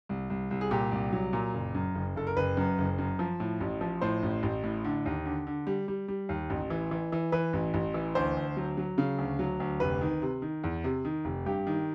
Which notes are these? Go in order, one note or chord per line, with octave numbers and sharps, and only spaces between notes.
C2
C2
C2
G#4
A#2 G4
C2
F#3
A#2
F#1
F#2
F#1
F#1 A4
A#4
F#1 B4
F#2
F#1
F#2
F3
A2
A1
F3
A2 C5
A1
A1
A2
D3
D#2
D3
D3
G3
G3
G3
D#2
A1
E3
E3
E3
E3 B4
A1
A1
E3
D2 C5
D2
F#3
F#3
C#3
D2
F#3
D2
F1 B4
D#3
C3
D#3
E2
C3
D#3
F1
G2 G4
D#3